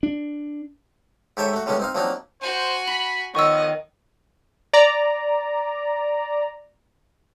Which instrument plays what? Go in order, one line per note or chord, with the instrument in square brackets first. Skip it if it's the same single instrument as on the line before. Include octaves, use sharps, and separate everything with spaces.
[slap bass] D4
[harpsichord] G#2 G4 A4 C#5 E5 G5
A3 F#4
A2 D3 G3 G#3 B3 C#4
C4 D#4 F5
F3 F#3 A#3 C4 D4 D#4
[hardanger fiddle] F#4 G#5 [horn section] C5
[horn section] B5 [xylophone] F#7
[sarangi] D#3 [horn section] F3 B3 [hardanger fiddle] C#5 D#5 [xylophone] C#6 E6
[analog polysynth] D5 A#5